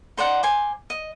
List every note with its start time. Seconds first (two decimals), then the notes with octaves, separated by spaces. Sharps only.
0.17 D#4 C5 D5 F#5
0.43 C5 G#5 D6
0.90 D#5